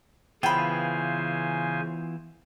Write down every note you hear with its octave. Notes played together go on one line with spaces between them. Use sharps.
C#3 E3 B3 F4 C5 G5 G#5 B5